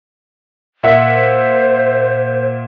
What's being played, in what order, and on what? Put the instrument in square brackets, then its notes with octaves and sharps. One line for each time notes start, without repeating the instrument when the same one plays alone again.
[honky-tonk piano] A#2 E5 F#5
[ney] C5